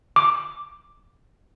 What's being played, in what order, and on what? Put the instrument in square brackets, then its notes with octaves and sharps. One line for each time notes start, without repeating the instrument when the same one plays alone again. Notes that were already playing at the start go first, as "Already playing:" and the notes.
[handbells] D6